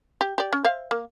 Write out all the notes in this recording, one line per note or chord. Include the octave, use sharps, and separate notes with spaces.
G4
G4 D5
C#4
C5 E5 F5
A#3